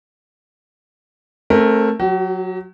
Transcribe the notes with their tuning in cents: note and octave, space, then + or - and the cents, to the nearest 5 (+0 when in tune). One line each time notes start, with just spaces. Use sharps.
A3 +0 C4 +35 A#4 +0
F#3 -10 F#4 +40